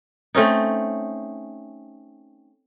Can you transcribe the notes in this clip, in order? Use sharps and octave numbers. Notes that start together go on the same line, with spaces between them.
A3 C4 C#4 D#4